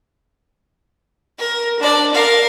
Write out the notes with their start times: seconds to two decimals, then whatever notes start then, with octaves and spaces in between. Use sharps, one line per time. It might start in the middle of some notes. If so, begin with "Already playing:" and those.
1.38 A#4
1.79 D4 D5
2.14 A#4 F5